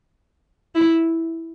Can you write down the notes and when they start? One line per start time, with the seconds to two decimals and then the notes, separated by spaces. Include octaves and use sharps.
0.75 E4